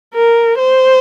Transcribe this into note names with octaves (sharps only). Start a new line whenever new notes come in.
A#4
C5